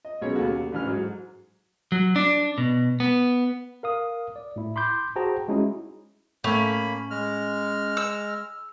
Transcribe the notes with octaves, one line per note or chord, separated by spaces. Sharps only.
D#5
B1 C#4 G#4 C#5
D#2 C#3 F#4 A4
A1 D3 E3 C#4 F6
G#2 F#3
F#3
D4
B2
B3
A#4 F5 D#6
D5
A2 E4
B5 C6 D6 G6
F#4 G#4 C5 G5 A5 A#5
G#3 C#4 D#4 E4 F#4
A2 A3 A#3 C#4 B5
G#3 F6
E6